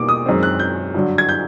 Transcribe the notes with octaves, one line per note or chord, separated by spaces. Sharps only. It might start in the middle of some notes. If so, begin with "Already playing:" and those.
Already playing: B2 G3 A#3 D#4 D6
D#6
F#2 D#3 G#3 C4
F#6
G6
G2 D3 F#3
G#6
G6